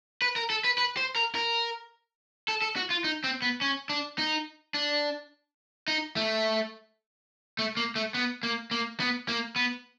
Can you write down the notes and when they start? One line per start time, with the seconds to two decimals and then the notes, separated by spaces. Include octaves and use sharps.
0.22 B4
0.36 A#4
0.50 A4
0.64 B4
0.78 B4
0.97 C5
1.16 A#4
1.35 A#4
2.48 A4
2.62 A4
2.76 F#4
2.90 F4
3.04 D#4
3.24 C4
3.42 B3
3.61 C#4
3.89 D4
4.18 D#4
4.74 D4
5.88 D#4
6.16 A3
7.59 A3
7.77 A#3
7.96 A3
8.14 B3
8.43 A#3
8.71 A#3
9.00 B3
9.28 A#3
9.56 B3